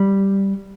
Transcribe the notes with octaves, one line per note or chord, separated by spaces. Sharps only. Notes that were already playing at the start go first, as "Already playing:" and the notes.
Already playing: G3